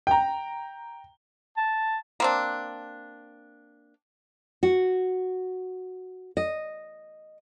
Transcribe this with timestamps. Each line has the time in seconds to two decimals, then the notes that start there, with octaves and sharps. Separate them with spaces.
0.07 G5 A#5
1.57 A5
2.20 A#3 C4 D4
4.63 F#4
6.37 D#5